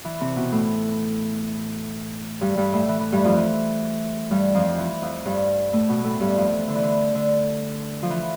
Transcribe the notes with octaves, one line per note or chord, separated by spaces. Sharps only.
E3
C3 C4
B2 B3
A2 A3
G2 G3
G2 G3
A2 A3
E3
E3
G2 G3
F2 F3
E3
G2 G3
F2 F3
E3
F2 F3
G2 G3
A2 A3
B2 B3
A2 A3
G2 G3
F2 F3
E3
D3
E3
D3
D3
F3
E3